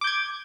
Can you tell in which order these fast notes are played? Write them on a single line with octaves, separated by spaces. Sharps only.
D6 G6 G#6